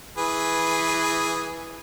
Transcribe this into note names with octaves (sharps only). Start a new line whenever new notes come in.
E3 G#4 B4